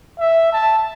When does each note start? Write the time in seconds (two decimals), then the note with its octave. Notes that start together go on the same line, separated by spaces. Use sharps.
0.19 E5
0.52 A5